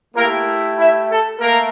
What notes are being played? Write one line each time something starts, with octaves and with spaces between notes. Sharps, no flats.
A3 A#3 E4 G4 A#4
E4 E5
A4
A3 A#3 A#4